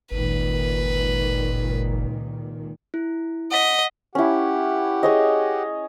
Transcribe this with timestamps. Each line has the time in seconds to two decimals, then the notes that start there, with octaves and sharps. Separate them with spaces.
0.11 G1 C#2 A#2 D#3 B4
2.94 E4
3.52 D#5 F#5 B6
4.15 C#4 E4 G4 F#5
5.03 G#4 C#5 D#5